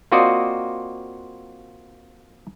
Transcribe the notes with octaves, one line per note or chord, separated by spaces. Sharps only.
A#3 C4 F4 F#4 D5 D#5